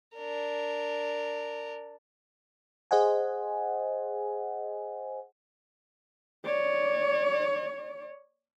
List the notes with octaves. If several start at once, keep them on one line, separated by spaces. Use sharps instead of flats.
D4 A#4
G#4 C5 D#5 F#5 G#5
C#5 D5